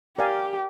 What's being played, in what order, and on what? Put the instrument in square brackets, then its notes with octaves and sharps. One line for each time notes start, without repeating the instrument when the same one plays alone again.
[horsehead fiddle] G4 [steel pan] A#4 D5 F5 G#5